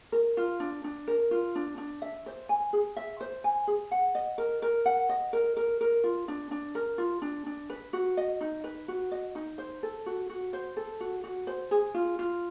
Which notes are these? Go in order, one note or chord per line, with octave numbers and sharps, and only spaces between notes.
A#4
F4
D4
D4
A#4
F4
D4
D4
E5
C5
G#5
G#4
E5
C5
G#5
G#4
F#5
D#5
A#4
A#4
F#5
D#5
A#4
A#4
A#4
F4
D4
D4
A#4
F4
D4
D4
B4
F#4
D#5
D#4
B4
F#4
D#5
D#4
C5
A4
F#4
F#4
C5
A4
F#4
F#4
C5
G#4
F4
F4